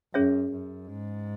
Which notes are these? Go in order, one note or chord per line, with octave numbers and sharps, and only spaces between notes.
F#2 C#4 G#4 C#5 E5
F#2
G#2